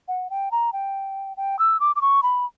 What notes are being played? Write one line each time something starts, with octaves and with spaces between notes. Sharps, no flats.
F#5
G5
A#5
G5
G5
E6
D6
D6
C#6
B5